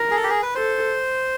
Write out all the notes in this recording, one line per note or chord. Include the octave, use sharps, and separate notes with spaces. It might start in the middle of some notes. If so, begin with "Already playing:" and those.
Already playing: A#4
G#4
A4
G4
G#4
B4
A4 C5